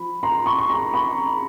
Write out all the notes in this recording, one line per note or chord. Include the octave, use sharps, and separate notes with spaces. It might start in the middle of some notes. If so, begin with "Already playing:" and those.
Already playing: F3 B5
A#5 C6
B5 C#6
C#6
A#5 C6
B5 C#6